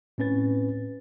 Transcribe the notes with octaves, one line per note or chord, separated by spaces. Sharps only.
A2 C4 C#4 B4 A6